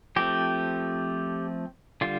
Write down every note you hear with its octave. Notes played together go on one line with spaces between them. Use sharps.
F3 A3 C4 G4
D3 G3 F4